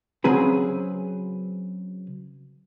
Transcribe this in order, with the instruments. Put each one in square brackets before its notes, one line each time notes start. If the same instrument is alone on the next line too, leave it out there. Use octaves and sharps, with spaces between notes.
[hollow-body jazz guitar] C#3 F#3 C4 G#4 B4